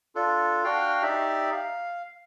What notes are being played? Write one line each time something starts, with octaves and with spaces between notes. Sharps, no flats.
D4 F4 A4
D4 F#4 F5 G5 F6
D#4 G4 D5 E5
F5